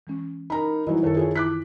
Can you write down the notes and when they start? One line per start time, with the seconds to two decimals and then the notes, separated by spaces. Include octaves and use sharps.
0.07 E3 G#3 C#4
0.50 D#4 A#4 A#5 B5
0.87 E3 F#3 G3 D#4 E4 D#5
1.03 F#2 D#3 A4 A#4 C#5
1.17 F4 G#4 A4 C#5
1.35 E3 E4 D6 F#6 B6